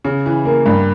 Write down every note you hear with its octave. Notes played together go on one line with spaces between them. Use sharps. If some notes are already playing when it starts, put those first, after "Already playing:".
C#3
E3
A#3
G2